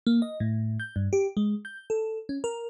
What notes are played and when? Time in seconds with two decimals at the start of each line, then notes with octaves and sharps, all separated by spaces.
0.07 A#3
0.22 D#5
0.40 A2
0.80 G6
0.96 G2
1.13 G4
1.37 G#3
1.65 G6
1.90 A4
2.29 C#4
2.44 A#4